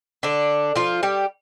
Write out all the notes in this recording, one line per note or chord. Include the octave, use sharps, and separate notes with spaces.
D3 D4
F3 F4
G3 G4